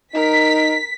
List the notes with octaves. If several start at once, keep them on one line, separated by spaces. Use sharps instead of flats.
D#4 A#4 B6